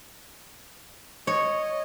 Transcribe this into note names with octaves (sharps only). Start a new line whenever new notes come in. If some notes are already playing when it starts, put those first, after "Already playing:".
C#5 D#5